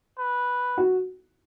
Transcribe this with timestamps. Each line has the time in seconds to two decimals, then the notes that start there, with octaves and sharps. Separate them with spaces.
0.18 B4
0.77 F#4